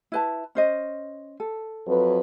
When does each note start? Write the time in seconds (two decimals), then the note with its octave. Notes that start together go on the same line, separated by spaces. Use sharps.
0.12 E4 B4 A5
0.55 C#4 C5 D#5
1.40 A4
1.88 F2 F#3 B4